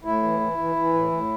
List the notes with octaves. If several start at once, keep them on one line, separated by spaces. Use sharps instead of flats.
A2 E4
E3
E3
E3
E3
A2
A2